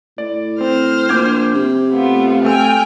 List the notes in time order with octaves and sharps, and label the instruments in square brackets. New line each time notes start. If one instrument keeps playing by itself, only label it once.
[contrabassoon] A2 [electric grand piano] D5
[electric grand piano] C4 [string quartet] C5 F6
[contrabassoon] A#1 [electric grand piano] D6 G6 G#6
[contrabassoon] C3
[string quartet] A3 B3 F4
[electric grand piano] A3 E6 [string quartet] G5 G#5 F6